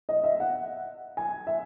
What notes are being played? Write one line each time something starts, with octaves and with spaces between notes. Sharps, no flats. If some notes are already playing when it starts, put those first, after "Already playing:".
D#5
E5
F#5
G#5
E5